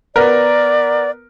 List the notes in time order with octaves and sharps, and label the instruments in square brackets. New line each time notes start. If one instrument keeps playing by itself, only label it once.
[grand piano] B3 A#4 [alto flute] D5